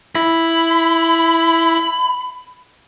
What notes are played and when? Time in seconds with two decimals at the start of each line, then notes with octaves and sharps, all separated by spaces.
0.15 E4 B5